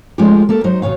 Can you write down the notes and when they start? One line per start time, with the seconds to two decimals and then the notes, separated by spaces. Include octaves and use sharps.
0.18 F3 G#3 A3 C#4 F4 G4
0.49 A#3 G4 A4
0.64 F#3 D#4 C5 D#5
0.82 D#2 B2 E3 C#5 F5